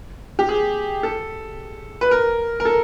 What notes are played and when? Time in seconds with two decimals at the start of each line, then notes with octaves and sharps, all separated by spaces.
0.39 G4
0.49 G#4
1.03 A4
2.01 B4
2.11 A#4
2.60 A#4
2.65 A4